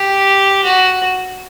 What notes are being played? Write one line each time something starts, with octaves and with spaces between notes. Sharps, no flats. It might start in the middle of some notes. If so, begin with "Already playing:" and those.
Already playing: G4
F#4